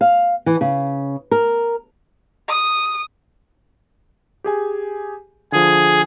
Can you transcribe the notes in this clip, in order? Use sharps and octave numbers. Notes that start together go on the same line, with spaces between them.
F5
E3
C#3
A#4
D#6
G4 G#4 G#5
D3 F3 G#4